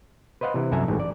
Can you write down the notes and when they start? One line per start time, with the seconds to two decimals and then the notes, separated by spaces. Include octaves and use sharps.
0.41 B4 C5 D#5 F5 F#5
0.54 C3 E3
0.71 C2 F#2 A4 E5 G#5 A#5
0.88 A1 G#2
1.00 D5